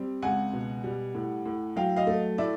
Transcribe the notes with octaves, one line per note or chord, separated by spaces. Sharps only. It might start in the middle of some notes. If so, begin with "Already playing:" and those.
Already playing: G3 C4
C#2 F#5 G#5
B2
G3
A2
A2
F#3 F5 G5
D#5 F5
A3
A2 D5 E5